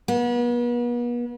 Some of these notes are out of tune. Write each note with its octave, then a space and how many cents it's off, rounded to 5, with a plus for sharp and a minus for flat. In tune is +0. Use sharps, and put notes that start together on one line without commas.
B3 -40